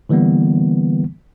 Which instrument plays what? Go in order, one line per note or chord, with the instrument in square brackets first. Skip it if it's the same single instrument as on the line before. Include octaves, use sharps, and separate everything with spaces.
[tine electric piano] D3 E3 G3 A#3 B3